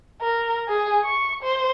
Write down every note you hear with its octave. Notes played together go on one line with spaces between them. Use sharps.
A#4
G#4
C#6
C5